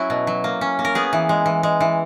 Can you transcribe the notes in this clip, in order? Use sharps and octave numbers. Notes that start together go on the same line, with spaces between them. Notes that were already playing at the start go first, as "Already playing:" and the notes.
Already playing: F#3 C#4 E4 F#4
B2
F#3
A#3
C#4
A#3
A#4
B3 G#4
E3
G#3
E3
G#3
E3